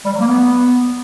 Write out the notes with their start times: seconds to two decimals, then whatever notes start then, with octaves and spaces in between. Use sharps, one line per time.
0.05 G3
0.12 F#3
0.20 A#3
0.27 B3